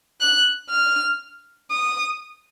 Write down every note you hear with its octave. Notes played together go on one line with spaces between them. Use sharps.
F#6
F6
D#6